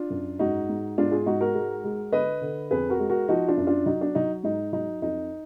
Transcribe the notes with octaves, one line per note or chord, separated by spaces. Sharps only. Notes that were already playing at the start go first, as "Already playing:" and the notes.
Already playing: D4 F4
F#2
G#2 D#4 F#4
G#2
G#2 D4 F4
F4 G#4
G#2 D#4 F#4
F#4 A#4
G#3
G#3
D3 B4 D#5
D3
F2 G#4 B4
F#4 A#4
G#3
F#4 A#4
F3 D#4 F#4
D4 F4
F#2
D4 F4
F#3 D#4
D4
F#3 D#4
G#2 D#4
F#3 D#4
F2 D#4